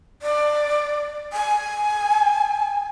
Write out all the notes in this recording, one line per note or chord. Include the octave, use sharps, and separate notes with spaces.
D5
G#5